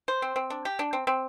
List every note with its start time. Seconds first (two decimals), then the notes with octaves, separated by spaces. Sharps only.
0.08 C5
0.22 C4
0.36 C4
0.50 D4
0.65 G4
0.79 D4
0.93 C4
1.07 C4